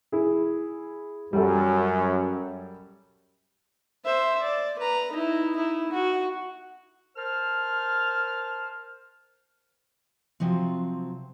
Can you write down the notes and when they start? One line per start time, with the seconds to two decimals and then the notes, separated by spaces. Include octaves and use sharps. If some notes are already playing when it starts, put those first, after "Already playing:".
0.12 E4 G#4
1.33 F#2 G3 A4
4.05 C5 E5
4.42 D5
4.79 B4 A#5
5.12 D#4 E4
5.55 D#4 E4
5.93 F#4
7.17 A#4 C5 A5 F6
10.40 C3 F3 F#3 C4